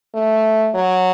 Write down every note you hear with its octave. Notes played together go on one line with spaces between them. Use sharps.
A3
F#3